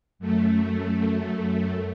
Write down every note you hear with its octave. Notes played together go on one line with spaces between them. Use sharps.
F#2 A3